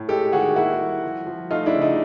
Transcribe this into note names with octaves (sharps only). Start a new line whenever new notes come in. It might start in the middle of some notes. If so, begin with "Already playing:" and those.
Already playing: A2
G#3 G4 A4
D#3 F#4 G#4
A#3 E4 F#4
G3
F3
F3
A3 D#4 F4
D4 E4
C#3
D#4